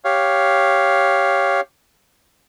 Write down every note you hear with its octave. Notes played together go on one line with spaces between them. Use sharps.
G4 C#5 F5